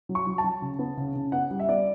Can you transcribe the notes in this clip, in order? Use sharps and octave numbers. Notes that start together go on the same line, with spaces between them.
F#3
C#6
F#3
A5
F#3
C#3
B3
C#3
C#3
B3 F#5
G3
E5
B3 D5